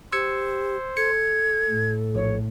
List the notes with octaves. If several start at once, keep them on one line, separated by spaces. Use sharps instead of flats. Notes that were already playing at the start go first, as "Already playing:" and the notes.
G4 C5 E6 G#6 C#7
A4 G#6 C#7
A2
A#1 C#5